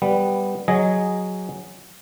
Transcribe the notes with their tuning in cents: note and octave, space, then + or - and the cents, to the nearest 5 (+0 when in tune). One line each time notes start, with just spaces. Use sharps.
G3 +0 B3 +0
F#3 +0 G#4 +0 D#5 +0